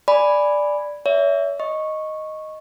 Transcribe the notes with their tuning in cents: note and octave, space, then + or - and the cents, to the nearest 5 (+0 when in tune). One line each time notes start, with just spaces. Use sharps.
D5 +0 G#5 +0 B5 +0
C#5 +35 E5 +0
D#5 +0 C#6 -10